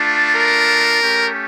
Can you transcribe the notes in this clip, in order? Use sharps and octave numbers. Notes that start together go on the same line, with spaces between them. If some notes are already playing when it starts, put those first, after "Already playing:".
Already playing: A3 D4 F4
A#4
A3 C#4 G4